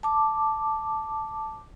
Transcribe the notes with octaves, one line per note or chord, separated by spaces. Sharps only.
A5 D6